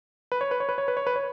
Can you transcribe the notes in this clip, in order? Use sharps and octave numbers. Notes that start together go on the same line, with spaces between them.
B4
C#5
B4
C#5
B4
C#5
B4
C#5
B4
C#5